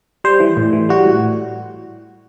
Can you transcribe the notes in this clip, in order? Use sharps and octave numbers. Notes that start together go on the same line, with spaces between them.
G3 C5
E3
A2
E3
G3 F#4
A2